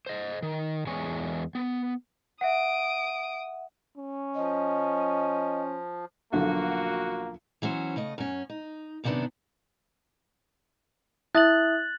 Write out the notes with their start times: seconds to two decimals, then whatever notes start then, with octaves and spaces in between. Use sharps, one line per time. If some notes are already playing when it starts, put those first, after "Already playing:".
0.06 C5 D#5
0.43 D#3
0.87 E2 G#3 C#5 G#5
1.55 B3
2.41 E5 F#5 D#6 D7
3.97 C#4
4.35 F3 D#5
6.33 B1 D3 F3 A#3 F#4
7.62 E3 F#3 C#4 C5
7.96 C#3 A3 D#5
8.18 F#2 C#4
8.50 D#4
9.04 F#2 C3 D#3 G#3 B3 D4
11.35 E4 E5 D#6 F#6 A6 F#7